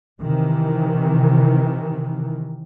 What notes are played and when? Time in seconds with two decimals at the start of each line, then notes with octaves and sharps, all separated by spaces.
0.22 C3 D#3 E3